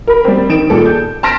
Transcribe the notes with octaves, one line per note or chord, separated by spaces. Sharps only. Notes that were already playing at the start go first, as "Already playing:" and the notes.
A#4 B5
G3 C4
D#3 D7 E7
A#2 G3 G#4 A4
G6
A5 C6 F6 A#6 B6 D7